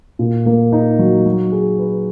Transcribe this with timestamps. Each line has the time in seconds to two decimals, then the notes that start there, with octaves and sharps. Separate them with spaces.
0.19 A#2
0.46 A#3
0.72 D#4
0.99 F#3
1.26 F#3
1.52 G#4
1.79 B4